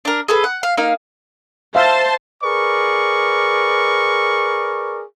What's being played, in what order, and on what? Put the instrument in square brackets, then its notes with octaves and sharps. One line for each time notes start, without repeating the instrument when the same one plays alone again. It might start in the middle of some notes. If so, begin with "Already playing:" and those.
[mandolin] D4 A#4
G#4 A4 B4
F#5
F5
A#3 D#4 F5
[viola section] C5 A5 C6 [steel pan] E5 F5
[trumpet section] G#4 A#4 B4 D5 C#6